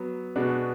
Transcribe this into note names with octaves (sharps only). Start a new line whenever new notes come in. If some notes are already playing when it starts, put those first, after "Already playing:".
Already playing: F#3 B3
B2 G#3 B3 D4 F#4